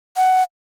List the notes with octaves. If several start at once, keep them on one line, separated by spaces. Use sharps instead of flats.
F#5